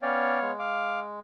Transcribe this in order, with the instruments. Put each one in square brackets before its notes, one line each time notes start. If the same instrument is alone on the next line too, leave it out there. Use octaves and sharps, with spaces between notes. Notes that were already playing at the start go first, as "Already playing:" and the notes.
[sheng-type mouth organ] B3 C#5 F5 [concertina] C#4 D5 G5
[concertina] G#3
[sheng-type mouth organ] F5 D6